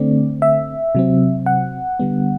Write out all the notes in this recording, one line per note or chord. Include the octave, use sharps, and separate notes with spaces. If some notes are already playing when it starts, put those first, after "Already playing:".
Already playing: D3 A3 C4 D5
E5
C3 F#3 C4
F#5
D3 G3 B3